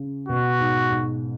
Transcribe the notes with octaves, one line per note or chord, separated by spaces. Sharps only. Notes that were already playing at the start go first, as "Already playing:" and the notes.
Already playing: C#3
B2 F#4
G#2
G#2